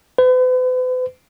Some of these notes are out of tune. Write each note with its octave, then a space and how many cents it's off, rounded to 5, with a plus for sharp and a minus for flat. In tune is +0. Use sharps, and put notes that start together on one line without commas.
B4 +45